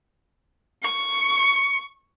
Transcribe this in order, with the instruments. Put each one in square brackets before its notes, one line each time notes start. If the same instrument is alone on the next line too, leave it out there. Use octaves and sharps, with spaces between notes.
[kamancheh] C#6
[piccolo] C#7